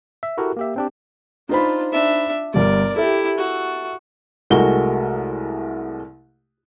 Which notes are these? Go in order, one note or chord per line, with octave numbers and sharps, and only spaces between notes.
E5
E4 F#4 G4 A4 A#4
A#3 G4 E5
C4 D4 G4
D4 D#4 F4 C5 B5
D4 E5
G1 G3 A#4 D5
E4 G4 A4 E5
F#4
C2 G#3 A3 F#4 A#4 G7